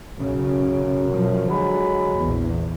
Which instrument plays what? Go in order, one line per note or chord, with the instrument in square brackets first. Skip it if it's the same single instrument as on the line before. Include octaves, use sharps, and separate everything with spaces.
[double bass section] B1 C#3 [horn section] F#2
[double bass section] B2 F3 F#3
[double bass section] D3 [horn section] F#3 G#3 B5
[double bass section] A#1 E2